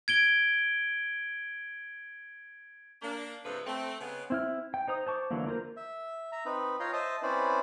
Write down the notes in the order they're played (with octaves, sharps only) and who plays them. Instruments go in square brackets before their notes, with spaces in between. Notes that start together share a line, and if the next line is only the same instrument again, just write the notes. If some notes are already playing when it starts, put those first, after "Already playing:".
[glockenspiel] G#6 D7 G7
[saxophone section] A#3 D4
G2 C3 F3 G#3 A3 B4
A3 C4
C#3 G#3 B3
[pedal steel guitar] C4 E4 F6
G5
D#4 C5 A#5 D#6
C5 A5 C#6 D6
D3 E3 F#3 A#3
A#3 F4 A#4 C5
[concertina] E5
E5 A#5
C4 D#4 B4
F4 C#5 G5 A#5 C6
C5 D#5 E5 A5 D#6
C4 C#4 E4 B4 C5 D5